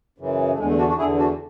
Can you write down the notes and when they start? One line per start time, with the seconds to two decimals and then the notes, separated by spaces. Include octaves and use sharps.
0.18 F#2 C#3 E3
0.53 A3
0.58 E2 D3 G#3
0.68 A3
0.78 D4 F#4
0.88 D4 F#4
0.98 D3 E4 G#4
1.02 E2
1.18 D4 F#4